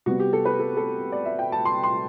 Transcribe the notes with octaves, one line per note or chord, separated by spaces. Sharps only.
C3 G3 B3 F#4
G4
A4
B4
A4
A4
D5
E5
G5
A5
C6
C6